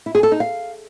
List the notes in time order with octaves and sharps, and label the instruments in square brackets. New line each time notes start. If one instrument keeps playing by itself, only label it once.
[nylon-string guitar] E4
G#4
A4
D#4
F5